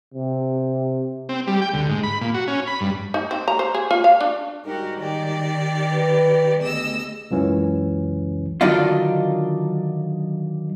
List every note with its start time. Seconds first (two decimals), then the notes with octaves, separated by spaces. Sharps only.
0.14 C3
1.29 C4
1.47 G3
1.61 G5
1.74 D2
1.89 G#2
2.03 B5
2.21 A#2
2.34 F#4
2.48 C#4
2.67 B5
2.81 G2
3.14 D#4
3.31 C4
3.48 A#5
3.59 C5
3.75 G#4
3.91 F4
4.04 F5
4.21 D4
4.64 G#2 G3 D#4 F#4 G4 A#4
4.98 D#3 G4 D5
5.93 B4
6.59 D2 B3 G4 G#4 D#5 E6
7.31 C#2 F#2 C#3 E3 C#4
8.61 D3 D#3 F#3 D4 D#4 F4